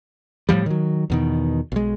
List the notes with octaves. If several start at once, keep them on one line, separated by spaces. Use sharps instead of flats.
A2 C3 F3 G3
D#3 F#3
E2 B2 D#3
B1 G#3